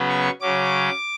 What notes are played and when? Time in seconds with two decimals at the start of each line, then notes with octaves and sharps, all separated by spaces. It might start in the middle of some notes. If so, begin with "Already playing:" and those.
Already playing: C#3 F#3 B3
0.09 C#6
0.41 C#3 F#3 C#4 D6